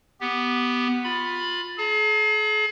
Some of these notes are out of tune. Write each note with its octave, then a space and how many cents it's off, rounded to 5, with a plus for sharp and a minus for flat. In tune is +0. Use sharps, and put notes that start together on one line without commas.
B3 +0 G4 +0
F4 +20 B5 +0
G#4 +45 A5 +40